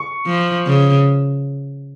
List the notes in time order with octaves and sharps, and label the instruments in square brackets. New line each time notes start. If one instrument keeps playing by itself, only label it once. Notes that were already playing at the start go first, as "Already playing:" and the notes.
Already playing: [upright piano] C#6
[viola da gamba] F3
C#3